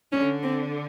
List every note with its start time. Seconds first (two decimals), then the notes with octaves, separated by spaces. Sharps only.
0.12 D3 C#4
0.43 C4